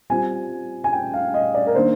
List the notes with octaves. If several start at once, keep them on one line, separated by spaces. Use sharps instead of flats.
G3 C4 F4 G#5
G#5
G5
F5
D#5
D5
A#4
D#3 A#3 D4 C5